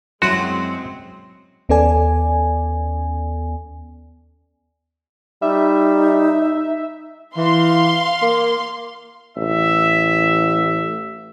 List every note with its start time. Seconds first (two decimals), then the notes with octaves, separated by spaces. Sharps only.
0.22 F#2 F#3 G#3 C4 E4 F#4 C6
1.69 D#2 B3 C#4 A4 D5 G#5
5.42 G3 D#4 E5
7.37 E3 F5 C6
8.22 A#3
9.37 A1 E5